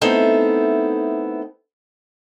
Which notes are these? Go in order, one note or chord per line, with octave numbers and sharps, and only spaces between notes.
A3 B3 C4 D#4 E4 A4